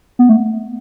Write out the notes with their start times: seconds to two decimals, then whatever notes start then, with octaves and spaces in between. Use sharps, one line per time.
0.19 B3
0.29 A3